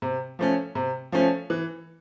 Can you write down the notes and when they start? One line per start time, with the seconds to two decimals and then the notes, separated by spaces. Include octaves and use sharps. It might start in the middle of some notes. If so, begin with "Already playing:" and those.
0.02 C3
0.39 F3 A3 C#4
0.75 C3
1.12 F3 A3 C#4
1.50 E3